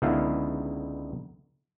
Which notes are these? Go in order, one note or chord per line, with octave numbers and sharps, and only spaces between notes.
C#2 D3 B3 D#4 E4 F5